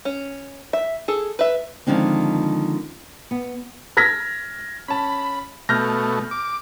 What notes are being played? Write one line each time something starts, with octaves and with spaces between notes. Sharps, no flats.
C#4
E5
G#4 A4
B4 E5
D3 D#3 F3 G#3 C4
B3
F6 G#6 A#6 B6
C#4 A5 B5
B2 A3 F6 G6 A#6
D6